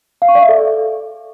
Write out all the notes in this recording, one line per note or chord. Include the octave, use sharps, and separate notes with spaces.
F5
C#6
D5
E5
A4